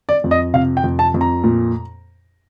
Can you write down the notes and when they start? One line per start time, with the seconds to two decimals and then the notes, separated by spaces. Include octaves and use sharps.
0.09 D5
0.24 F2
0.31 D#5
0.54 C3 F5
0.77 G5
0.84 F2
0.99 A5
1.14 F2
1.21 A#5
1.44 A#2